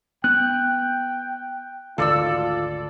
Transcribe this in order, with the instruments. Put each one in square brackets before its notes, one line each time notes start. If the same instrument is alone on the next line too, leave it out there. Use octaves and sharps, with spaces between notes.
[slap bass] B3 [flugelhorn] G5 [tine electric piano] F#6
[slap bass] G#1 D2 [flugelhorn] F4 [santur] A4 D5 E6